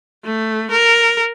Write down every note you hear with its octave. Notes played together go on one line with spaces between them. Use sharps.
A3
A#4